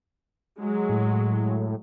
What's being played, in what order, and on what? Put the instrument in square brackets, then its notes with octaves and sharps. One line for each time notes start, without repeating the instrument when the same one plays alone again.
[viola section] F#3 G#3
[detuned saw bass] A2